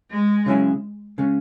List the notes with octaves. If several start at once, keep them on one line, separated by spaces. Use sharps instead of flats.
G#3
C#3 F#3 C#4 E4 G#4
C#3 G#3 C#4